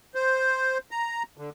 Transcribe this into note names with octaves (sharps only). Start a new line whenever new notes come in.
C5
A#5
D3